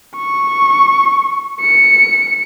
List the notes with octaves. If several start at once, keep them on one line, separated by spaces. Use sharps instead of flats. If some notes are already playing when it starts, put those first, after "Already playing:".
C#6
C#7